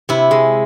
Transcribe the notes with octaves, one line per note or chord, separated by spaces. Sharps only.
C3 E4
G#3